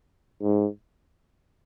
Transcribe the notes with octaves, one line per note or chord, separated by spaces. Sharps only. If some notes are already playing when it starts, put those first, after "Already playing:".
G#2